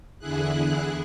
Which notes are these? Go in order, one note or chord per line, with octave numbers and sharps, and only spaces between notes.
E2 D3 E4 G#4 F#6